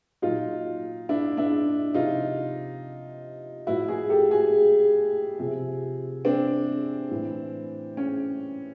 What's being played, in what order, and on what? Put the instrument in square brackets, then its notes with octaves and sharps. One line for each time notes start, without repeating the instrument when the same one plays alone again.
[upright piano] A#2 F#3 D#4 F4
D4 E4
D4 E4
C3 F3 D#4 F4
A2 F3 E4 F#4
F#4 G#4
G4 A4
F#4 G#4
C3 F3
C4 D4
A2 E3
C#4